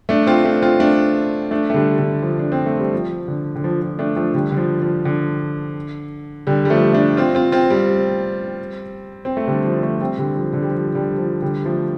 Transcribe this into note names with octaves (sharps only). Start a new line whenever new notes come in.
A3 D4
C4 F4
A3 D4
C4 F4
A3 D4
A3 D4
A3
D3 G3
D3
F3
D4
C4
A3
G3
F3
D3
D3
F3
F3
A3 D4
F3 A3
D3 G3
D3
F3
F3
D3
D3 G3
G3
F3 A3
A3 D4
C4 F4
C4 F4
C4 F4
G3 C4
C4
A3
D3 G3
F3
F3 A3
G3 C4
D3 G3
F3
D3
G3
F3
D3 G3
F3
D3 G3
F3 A3